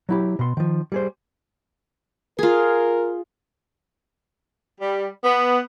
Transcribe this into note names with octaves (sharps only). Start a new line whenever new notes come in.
F#3 E4 G4
B2 C6
D#3 F3
G3 G#4 C5
F4 G#4 A#4
G3
B3